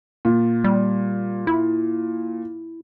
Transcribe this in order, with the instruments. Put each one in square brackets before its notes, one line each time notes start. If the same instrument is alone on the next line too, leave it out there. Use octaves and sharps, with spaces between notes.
[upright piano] A#2
[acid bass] G3
E4